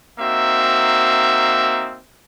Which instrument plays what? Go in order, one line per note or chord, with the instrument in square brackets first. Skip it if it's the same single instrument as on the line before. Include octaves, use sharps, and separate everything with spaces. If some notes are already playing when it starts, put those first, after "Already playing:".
[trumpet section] A#3 C4 D#4 F#4 E5